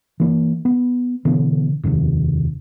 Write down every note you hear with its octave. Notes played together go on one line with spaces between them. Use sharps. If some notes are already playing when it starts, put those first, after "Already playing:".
E3 A#3
B3
B2 D3 E3 B3
F1 D#2 G#2 C3